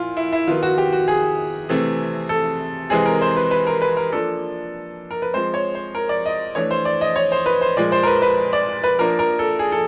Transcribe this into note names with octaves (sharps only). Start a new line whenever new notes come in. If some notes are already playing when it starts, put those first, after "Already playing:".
Already playing: A#2 E4 F4
E4
E4
D#3 F#3 B3 F4
F#4
G4
F#4
G#4
C3 E3 A3 C4
A4
C3 E3 G#3 C4 G#4
A#4
C5
B4
B4
A#4
B4
A#4
F3 A#3 D4 A4
A#4
B4
F3 G#3 C4 C5
C#5
C5
A#4
D5
D#5
E3 A3 D4 C#5
C5
D5
D#5
C#5
C5
B4
C5
A#2 F3 G#3 D5
C5
A#4
B4
B4
D5
B4
F3 A#3 D4 A#4
A#4
A4
G#4
A4